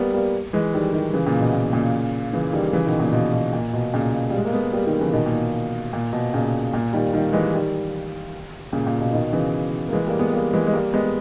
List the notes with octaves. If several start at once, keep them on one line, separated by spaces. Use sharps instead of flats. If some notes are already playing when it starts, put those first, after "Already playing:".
Already playing: G3 A#3 B3
G3 A#3
E3 G#3
D#3 G3
D#3 G3
C#3 E3
A#2 C#3
B2
A#2
A#2 C#3
C#3 E3
D#3 G3
C#3 E3
B2 D#3
A#2 C#3
B2
B2
A#2
B2
A#2 C#3
B2
G3
G#3
A#3
G#3 B3
G3 A#3
D#3 G3
C#3 E3
B2 D#3
A#2
A#2
B2
A#2 C#3
A#2
D#3 G3
D#3 G3
E3 G#3
D#3 G3
A#2 C#3
A#2
B2
B2 D#3
C#3 E3
A#3
E3 G#3
G3 A#3
G#3 B3
G3 A#3
E3 G#3
G#3
G3 A#3
G#3 B3